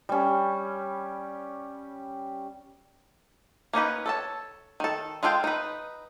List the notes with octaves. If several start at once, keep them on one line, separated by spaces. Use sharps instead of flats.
G3 C#4
A#3 C#4 D#4 B4
A4 C#5 A5
D#3 A4
G#3 F4 A4 F5 G5
D#4 B4